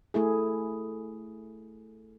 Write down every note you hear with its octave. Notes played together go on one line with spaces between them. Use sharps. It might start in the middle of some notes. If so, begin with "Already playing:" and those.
A3 E4 G#4